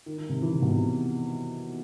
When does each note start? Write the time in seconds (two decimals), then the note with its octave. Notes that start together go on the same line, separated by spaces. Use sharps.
0.06 D#3
0.18 D#3
0.29 C3
0.42 E3
0.53 C3
0.62 B2
0.71 C3